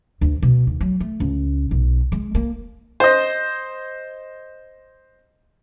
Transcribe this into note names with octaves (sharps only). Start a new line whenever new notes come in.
D2
B2
D#2
F#3
A3
C#2
B1
G#3
A#3
C5 D#5